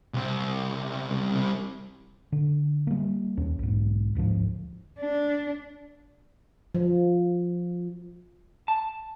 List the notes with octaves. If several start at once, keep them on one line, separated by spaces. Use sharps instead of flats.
C2 C3
D3
G3 A#3
D#2 C#4
B1 G#2
A1 D2 G#2 F3
D4
F3
A5